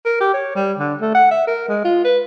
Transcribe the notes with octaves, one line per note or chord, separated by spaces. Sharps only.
A#4
G4
C#5
G3
D3
A3
F#5
E5
A#4
G#3
F4
B4